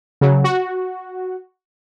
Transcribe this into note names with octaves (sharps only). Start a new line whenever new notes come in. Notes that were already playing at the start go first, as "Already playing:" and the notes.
C#3 F#3
F#4